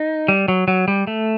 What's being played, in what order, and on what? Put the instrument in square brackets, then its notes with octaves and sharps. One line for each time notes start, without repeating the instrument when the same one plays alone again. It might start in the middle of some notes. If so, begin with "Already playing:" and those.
Already playing: [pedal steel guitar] D#4
G3
F#3
F#3
G3
A3